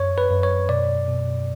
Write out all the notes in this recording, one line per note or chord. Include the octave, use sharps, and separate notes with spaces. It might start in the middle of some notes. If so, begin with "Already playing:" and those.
Already playing: F#2 C#5
B4
F#2
C#5
B2 D5
B2